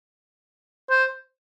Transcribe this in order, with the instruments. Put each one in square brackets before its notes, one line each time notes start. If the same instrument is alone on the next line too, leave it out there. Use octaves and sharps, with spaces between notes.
[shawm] C5